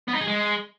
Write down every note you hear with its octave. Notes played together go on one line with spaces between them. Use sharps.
B3
D#4
G#4
G#3